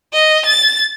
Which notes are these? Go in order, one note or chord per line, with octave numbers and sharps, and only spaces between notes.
D#5
A6